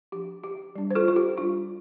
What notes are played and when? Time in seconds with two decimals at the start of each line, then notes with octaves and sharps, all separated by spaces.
0.12 F3 D4 G4
0.44 G4
0.75 G3 D4
0.91 C5
0.95 F4 A4
1.08 F4
1.16 G4
1.37 G3 D4 F4